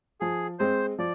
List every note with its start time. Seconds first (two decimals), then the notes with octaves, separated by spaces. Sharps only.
0.20 F3 G#4
0.59 G#3 C4 C5
0.99 F3 D5